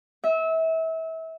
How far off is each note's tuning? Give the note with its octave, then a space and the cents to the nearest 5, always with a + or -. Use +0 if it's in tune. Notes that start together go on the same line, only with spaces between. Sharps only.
E5 -30